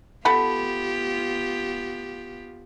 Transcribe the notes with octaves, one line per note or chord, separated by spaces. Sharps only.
B3 F4 G4 A4 F#5 B5